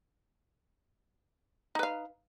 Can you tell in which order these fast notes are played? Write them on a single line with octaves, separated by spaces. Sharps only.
D#4 B4 F5